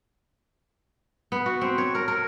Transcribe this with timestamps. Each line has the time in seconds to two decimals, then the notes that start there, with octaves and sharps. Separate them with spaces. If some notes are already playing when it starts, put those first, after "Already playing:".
1.32 B3
1.46 F#4
1.61 C4
1.78 C#5
1.95 A#4
2.08 A#4